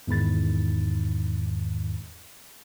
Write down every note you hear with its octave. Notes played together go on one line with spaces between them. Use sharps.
E2 G#2 D#3 B5 A6